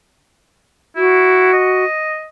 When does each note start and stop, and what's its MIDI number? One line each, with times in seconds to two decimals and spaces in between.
0.96 1.51 64
0.96 1.84 66
1.53 2.25 75